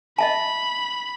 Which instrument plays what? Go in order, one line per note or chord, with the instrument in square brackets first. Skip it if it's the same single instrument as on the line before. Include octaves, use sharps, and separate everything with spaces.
[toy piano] D#5 E5 A5 [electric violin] B5